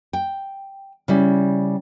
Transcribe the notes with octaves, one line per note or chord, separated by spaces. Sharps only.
G5
C#3 G3 E4